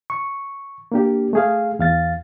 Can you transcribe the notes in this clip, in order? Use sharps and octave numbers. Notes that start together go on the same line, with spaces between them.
C#6
A#3 D4 G4
A3 G#4 F5
E2 F5 A6